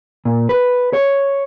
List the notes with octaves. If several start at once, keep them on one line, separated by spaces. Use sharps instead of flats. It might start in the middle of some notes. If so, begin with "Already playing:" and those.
A#2
B4
C#5